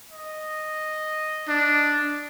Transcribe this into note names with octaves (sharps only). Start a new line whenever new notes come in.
D#5
D4